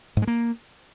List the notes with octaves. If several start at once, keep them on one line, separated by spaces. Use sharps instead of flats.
G#2
G#3
A#3